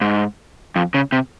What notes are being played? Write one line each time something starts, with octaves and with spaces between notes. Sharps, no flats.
G#2
F2
C#3
C3